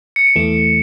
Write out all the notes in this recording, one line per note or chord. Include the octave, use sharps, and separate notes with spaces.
C#7
D7
E2 E3 A3 E7